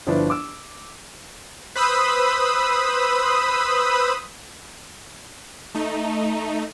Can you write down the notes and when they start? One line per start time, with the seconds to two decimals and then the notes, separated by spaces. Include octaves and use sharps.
0.07 G1 F3 D4 E4 B4
0.30 D6 E6
1.76 B4 C5 B5 D#6 E6
5.75 A3 D#4